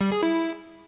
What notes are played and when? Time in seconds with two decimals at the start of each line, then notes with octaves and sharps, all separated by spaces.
0.01 G3
0.12 G#4
0.23 E4